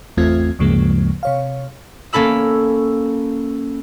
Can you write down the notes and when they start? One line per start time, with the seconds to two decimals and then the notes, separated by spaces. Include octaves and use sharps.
0.17 G#1 E2 A3 C4 F4 G#6
0.59 D2 G2 C#3 F3 G#3 A#3
1.23 C3 C#5 F5
2.13 A#3 C#4 A4 B5 E6